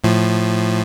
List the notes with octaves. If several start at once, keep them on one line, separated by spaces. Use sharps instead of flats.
A2 F3